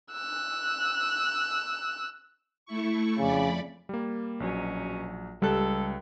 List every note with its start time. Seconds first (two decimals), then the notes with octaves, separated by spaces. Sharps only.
0.12 E6 F#6
2.65 A3 E4 C#6
3.18 F2 C#3 D5 B5
3.89 G3 A#3
4.40 A#1 B2 F#3 C#4
5.42 C#2 G3 A4 F#6